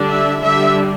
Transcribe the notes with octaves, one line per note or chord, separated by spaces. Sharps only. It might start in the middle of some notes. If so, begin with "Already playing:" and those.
Already playing: D3 G3 D4
E5
D3 G3 D4 E5